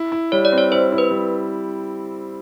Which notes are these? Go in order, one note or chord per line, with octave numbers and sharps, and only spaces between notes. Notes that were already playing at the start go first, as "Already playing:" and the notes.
Already playing: E4
E4
G3 C#5
D5
C4
C#5
E4 C5
E4
B4
G3